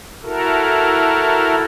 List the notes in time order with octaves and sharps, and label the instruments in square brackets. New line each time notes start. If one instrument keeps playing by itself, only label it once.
[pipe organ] E4 F#4 A4 A#4